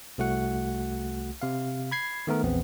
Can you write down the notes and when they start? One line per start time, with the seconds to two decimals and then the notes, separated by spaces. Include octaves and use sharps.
0.18 C2 A3 F#4 F#5
1.42 C3 F5
1.91 B5 G#6 C7
2.27 D#3 A3 B3 A#4
2.43 A#1 E2 B3 C4